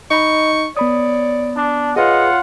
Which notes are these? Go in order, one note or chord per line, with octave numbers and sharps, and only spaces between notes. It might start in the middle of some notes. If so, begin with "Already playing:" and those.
D#4 D#5 B5 C#6
B3 C#5 D5 B5 D#6
D4
F4 G#4 B4 C#5 D#5 F#5